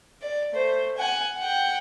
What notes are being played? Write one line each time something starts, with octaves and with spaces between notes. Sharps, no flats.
D5
A3 C5
F#5 G#5
F#5 G5